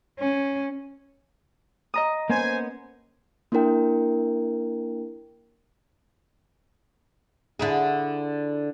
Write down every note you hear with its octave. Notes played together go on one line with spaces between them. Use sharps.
C#4
D#5 A#5 D#6
A#3 B3 C#4 C5 G#5
A#3 D4 E4 A#4 G5
D3 E4 G#4